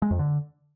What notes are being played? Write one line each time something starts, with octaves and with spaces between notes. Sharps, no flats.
G#3
F2
D3